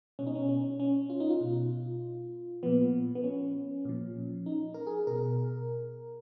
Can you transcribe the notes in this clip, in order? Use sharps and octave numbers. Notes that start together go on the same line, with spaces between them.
B2 C#4
D#4
C#4
C#4
C#4
F4
D#4
F4
B2
A#2 F3 B3
B3
C#4
A#2 F3
D#4
A#4
G#4
B2 A#4